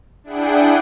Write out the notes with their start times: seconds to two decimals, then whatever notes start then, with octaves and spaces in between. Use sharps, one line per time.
0.24 D4 E4 G#4 F#5 G5